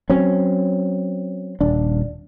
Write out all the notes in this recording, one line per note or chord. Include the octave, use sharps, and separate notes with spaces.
F#3 C4 C#4
D#1 D4